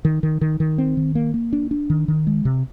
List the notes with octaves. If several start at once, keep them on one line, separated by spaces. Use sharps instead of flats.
D#3
D#3
D#3
D#3
C4
D#3
A#3
A#3
D4
D4
D#3
D#3
G#3
C3